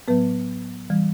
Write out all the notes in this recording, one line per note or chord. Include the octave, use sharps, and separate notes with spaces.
A2 F#3 B3 B4
E3 G3